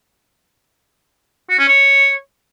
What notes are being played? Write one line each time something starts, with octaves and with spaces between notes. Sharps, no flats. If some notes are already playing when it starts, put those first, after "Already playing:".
F#4
C#4
C#5